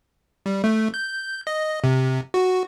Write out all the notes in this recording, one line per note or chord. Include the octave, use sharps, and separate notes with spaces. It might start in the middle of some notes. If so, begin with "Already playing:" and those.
G3
A3
G6
D#5
C3
F#4